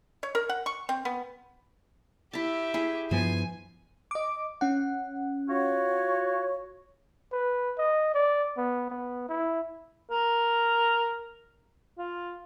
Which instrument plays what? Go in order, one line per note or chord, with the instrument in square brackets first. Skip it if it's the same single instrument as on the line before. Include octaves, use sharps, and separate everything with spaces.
[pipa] C#5
A#4
F#5
C#6
C4
B3
[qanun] E4 A5 [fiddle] G4 E5
[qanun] E4 G#4
[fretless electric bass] G2 F3 B3 [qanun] C5 [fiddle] G#5
[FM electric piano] D#5 D6
C#4 F#5
[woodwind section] F4 F#4 C#5
[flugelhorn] B4
D#5
D5
B3
B3
E4
[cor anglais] A#4
F4